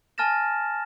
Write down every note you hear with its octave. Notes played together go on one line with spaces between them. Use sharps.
G#5 A5 F6 A6 A#6 E7